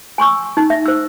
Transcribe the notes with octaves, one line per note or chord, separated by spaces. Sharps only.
G#5 C6 C#6 E6
D#4
E5
C5 E6